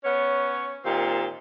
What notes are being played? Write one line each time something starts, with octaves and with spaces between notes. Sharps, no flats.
B3 C#4 C#5
A#2 D#3 C4 G4